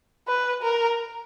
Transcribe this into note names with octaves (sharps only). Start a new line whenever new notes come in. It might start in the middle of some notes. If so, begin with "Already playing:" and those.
B4
A#4